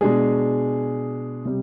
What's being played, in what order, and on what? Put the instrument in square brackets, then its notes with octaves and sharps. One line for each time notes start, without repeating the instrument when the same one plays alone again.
[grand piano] B2 G#3 D4 G#4
C3 G3